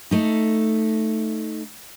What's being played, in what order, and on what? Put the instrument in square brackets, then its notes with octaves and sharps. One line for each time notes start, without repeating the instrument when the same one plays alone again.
[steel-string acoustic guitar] A3 D#4